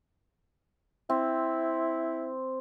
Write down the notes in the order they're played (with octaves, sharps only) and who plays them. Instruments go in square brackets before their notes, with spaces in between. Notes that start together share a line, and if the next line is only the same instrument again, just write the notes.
[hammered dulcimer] C4 [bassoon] E4